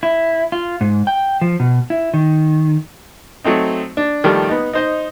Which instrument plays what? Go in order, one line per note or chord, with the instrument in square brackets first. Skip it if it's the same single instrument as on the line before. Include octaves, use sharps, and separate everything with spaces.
[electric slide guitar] E4
F4
G#2
G5
F3
B2
E4
D#3
[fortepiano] F#3 A3 C4 D#4
D4
D#3 F3 G3 A3
B3 D#4
D#4 C5 D#5